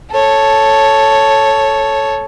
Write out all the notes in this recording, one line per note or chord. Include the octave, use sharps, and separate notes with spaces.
A4 C#5